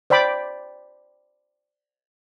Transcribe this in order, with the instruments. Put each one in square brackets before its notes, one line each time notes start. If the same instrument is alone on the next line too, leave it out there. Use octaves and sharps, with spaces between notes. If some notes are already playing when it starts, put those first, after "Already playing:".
[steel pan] C5 D5 G5 B5 D6